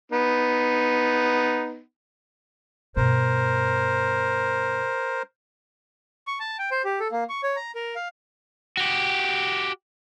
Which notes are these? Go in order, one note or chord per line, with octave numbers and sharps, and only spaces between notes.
B3 D#4
G2 B2 A#4 C5
C#6
A5
G5
C5
G4
A4
A#3
C#6
C#5
A#5
A#4
F5
F#4 G4